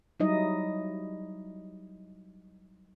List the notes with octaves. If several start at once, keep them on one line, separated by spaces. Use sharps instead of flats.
F#3 G3 D#4 E4 D#5